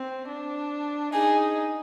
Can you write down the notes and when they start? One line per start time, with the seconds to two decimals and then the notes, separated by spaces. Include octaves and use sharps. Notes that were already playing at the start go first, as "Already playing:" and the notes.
Already playing: C4
0.28 D4
1.13 D#4 G#4